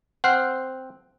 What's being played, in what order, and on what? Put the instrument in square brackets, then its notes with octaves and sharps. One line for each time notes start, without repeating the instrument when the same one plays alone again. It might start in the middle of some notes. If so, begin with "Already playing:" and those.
[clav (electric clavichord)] C4 C5 [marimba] F#5 [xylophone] F6 F#6 C7